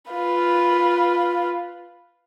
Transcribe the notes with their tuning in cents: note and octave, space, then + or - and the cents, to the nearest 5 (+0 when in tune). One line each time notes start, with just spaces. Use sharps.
F4 +0 B4 +0